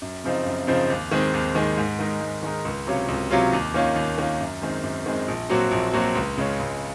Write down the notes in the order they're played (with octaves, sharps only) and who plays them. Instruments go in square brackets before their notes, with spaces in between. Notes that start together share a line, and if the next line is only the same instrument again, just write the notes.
[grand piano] F#2
C#3 F3 C4 D#4
F#2
C#3 F3 C4 D#4
D#2
D#3 G#3 C4
D#2
D#3 G#3 C4
G#2
D#3 G#3 D#4 A#4
G#2
D#3 G#3 D#4 A#4
C#2
C3 F#3 C#4 F4
C#2
C3 F#3 C#4 F4
D#2
D#3 A#3 C#4 F4
D#2
D#3 A#3 C#4 F4
F#2
D#3 G#3 C4
F#2
D#3 G#3 C4
A#1
A#2 F#3 C4 F#4
A#1
A#2 F#3 C4 F#4
C#2
C#3 G#3 C#4
C#2